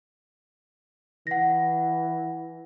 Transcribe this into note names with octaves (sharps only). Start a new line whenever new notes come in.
E3 F#5 A#6